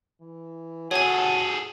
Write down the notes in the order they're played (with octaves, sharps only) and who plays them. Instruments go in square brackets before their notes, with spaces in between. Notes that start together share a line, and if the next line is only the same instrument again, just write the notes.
[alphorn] E3
[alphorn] F#4 [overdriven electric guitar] G#4 A4 [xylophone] C#5 G#5